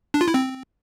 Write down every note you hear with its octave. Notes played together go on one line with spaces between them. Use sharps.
D4
F4
E4
C4